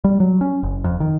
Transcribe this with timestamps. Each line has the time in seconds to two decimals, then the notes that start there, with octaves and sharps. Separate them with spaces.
0.04 G3
0.20 F#3
0.41 C#4
0.63 F#1
0.84 F2
1.00 D#3